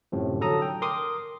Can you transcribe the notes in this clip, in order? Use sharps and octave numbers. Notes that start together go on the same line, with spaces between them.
F#2 A2 C3 F3
D3 F#3 A4 A#5 D#6
G5
A#4 C6 D6 D#6